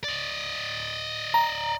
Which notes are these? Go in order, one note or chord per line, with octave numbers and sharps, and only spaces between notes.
D5 D#5
A#5